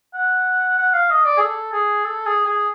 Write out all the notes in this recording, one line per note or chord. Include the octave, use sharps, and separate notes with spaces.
F#5
F#5
F5
D#5
D5
G#4
A4
G#4
A4
G#4
G#4